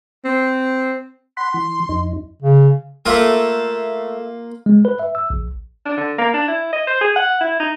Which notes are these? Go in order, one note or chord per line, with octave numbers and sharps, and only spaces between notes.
C4
F#5 B5 C6
E3
F2 D#4
C#3
A3 A#3 F4 E5
G#3
B4
E5
E6
A#1
D4
D3
A#3
D4
E4
D#5
C5
G#4
F#5
E4
D#4